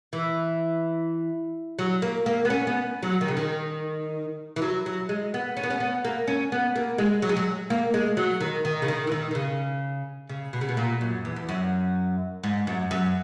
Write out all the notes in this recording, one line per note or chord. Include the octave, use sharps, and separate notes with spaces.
E3
F#3
A#3
A#3
B3
C#4
B3
F#3
D#3
C#3
D#3
E3
F#3
F#3
G#3
B3
C#4
B3
C#4
B3
A#3
C#4
B3
A#3
G#3
F#3
G#3
F#3
A#3
G#3
F#3
D#3
D#3
C#3
D#3
E3
D#3
D#3
C#3
C#3
B2
C#3
B2
A#2
F#2
E2
E2
F#2
G#2
F#2
F#2